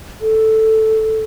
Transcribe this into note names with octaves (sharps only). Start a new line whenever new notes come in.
A4